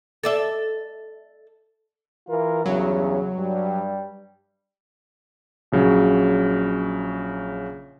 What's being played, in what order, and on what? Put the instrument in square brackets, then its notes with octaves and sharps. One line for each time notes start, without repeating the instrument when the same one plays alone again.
[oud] A4 D5 E5
[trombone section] E3 F4 A#4
[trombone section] E2 G2 C#3 [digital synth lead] F#3
[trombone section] G2 G3
[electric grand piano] A#1 C#3 F#3